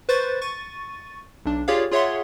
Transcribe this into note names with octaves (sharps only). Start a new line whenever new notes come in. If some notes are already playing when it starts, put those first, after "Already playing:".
B4 C5 C#6 A6
C#6 A6 D#7
B1 D4
F4 G4 G#4 C#5 D5 F5
F4 G#4 C#5 E5 F#5 C6